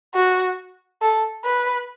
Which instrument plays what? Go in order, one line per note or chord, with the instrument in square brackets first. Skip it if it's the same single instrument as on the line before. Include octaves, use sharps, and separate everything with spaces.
[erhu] F#4
A4
B4